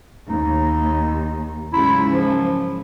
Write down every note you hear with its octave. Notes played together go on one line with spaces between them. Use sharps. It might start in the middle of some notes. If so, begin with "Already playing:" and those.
D#2 D#4
G#2 C#3 F#3 E4
F3